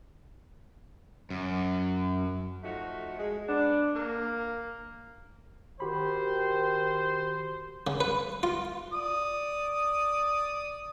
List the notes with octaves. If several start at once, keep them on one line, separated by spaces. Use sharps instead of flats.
F#2
F3 A3 D#4 F#4
G#3
B3 D4
A#3
D#3 F#4 G4 C5 B5
C#3
B4
F4
D5 D#6